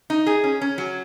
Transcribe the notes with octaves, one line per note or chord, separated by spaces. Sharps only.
D#4
G#4
C#4
C#4
F#3